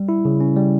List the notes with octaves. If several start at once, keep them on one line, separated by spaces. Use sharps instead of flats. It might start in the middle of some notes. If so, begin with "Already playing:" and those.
Already playing: G3
E4
C#3
C#4
G3